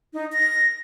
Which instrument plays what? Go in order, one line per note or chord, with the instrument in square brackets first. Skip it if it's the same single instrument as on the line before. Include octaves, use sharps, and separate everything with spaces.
[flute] D#4
A#6